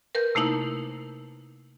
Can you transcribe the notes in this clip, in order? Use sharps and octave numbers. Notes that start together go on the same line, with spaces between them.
A#4 B4 G6
C3 A3 A#3 D#4 E4